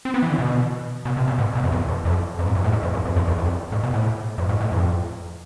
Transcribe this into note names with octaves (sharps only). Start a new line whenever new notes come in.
C4
B3
E3
D3
B2
B2
C3
B2
G#2
B2
F2
E2
E2
F2
F2
G#2
F2
A2
G#2
F2
E2
F2
E2
E2
F2
G#2
B2
A2
F2
G#2
A2
F2